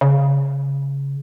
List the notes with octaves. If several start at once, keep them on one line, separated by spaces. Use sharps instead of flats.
C#3